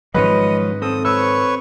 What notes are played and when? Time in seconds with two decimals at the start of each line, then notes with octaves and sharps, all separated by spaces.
0.14 G#2 D#3 F3 F#3 G#3 C#4 B4 D#5
0.82 C4 A4 D#6
1.05 B4 C#5 C#6 E6